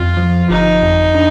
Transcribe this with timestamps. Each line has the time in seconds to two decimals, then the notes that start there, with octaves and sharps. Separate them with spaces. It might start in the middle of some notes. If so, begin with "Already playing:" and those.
Already playing: F2 F4
0.17 F3
0.50 G1 D#4
0.83 F2
1.15 D4